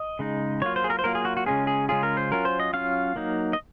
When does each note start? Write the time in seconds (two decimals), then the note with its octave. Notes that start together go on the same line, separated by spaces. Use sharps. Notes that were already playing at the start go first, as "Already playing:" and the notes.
Already playing: D#5
0.19 C#3 G#3 D#4
0.62 F#3 A#3 F4 C#5
0.76 C5
0.84 G#4
0.90 A#4
0.99 C5
1.04 F#3 A#3 F4 A#4
1.15 G#4
1.25 F#4
1.37 F#4
1.46 C#3 G#3 C#4 F4 G#4
1.67 G#4
1.89 C#3 G#3 C#4 F4 G#4
2.03 A#4
2.17 C5
2.31 F#3 C#4 F4 A#4
2.45 C5
2.60 D#5
2.73 F#3 C#4 F4 F5
3.16 F#3 A#3 D#4
3.53 D#5